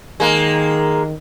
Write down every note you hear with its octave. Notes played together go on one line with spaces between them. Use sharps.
D#3 G#3 A#3